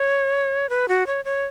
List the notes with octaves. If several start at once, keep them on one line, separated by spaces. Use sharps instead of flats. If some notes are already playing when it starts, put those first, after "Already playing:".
Already playing: C#5
B4
F#4
C#5
C#5